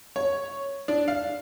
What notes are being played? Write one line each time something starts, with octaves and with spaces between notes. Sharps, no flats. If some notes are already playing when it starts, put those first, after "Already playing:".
C#5
D4
F5